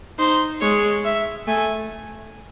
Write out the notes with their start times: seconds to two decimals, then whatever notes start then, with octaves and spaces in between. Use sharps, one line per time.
0.19 D#4 C5
0.61 G#3 C#5
1.04 E5
1.47 A3 G#5